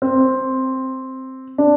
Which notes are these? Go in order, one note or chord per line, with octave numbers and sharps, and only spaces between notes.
C4
D4